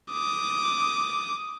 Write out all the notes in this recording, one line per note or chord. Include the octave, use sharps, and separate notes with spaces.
D6 D#6